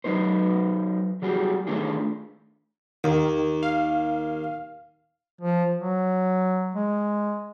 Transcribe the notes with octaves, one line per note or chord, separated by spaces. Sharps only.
F#3 D#4 B4 C5
F#3 G3 F#4 G#4
D#3 A3 D4 F4 G#4
D#2 D#3
F5
F3
F#3
G#3